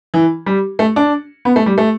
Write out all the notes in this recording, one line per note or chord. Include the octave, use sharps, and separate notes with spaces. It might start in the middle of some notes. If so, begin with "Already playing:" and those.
E3
G3
A3
D4
B3
A3
G3
A3